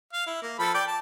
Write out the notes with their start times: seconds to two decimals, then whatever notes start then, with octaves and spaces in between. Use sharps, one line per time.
0.13 F5
0.26 E4
0.42 A#3
0.59 F3 A4 B5
0.74 D5 G5
0.87 A5